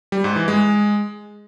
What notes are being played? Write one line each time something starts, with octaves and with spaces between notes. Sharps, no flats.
G3
G#2
E3
G#3